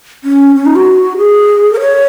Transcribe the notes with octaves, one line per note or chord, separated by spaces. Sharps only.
C#4
C#4
D#4
F#4
G#4
A#4
C#5